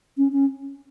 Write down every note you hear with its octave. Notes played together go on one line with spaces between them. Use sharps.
C#4
C#4